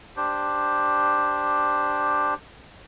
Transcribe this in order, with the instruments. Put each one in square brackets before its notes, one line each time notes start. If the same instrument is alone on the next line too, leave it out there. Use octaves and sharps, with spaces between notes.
[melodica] D4 G4 C5